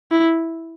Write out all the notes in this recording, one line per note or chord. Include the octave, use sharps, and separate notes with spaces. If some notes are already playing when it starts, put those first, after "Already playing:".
E4